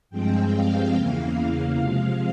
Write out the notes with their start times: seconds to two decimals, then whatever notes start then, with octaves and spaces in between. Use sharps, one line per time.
0.10 G2 F3 G#3 C4 G5
0.52 F5
0.94 E2 C#3 E3 A#3
1.77 C3 F3 G#3